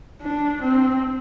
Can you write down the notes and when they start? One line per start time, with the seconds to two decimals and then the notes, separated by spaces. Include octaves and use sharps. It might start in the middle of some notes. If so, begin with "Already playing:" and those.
0.22 D4
0.62 C4